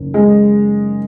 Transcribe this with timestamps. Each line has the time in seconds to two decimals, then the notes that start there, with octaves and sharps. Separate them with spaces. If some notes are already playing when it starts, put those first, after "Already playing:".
Already playing: F#1 D#3
0.14 G#3